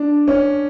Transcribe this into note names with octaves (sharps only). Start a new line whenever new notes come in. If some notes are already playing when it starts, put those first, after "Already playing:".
Already playing: D4
C#4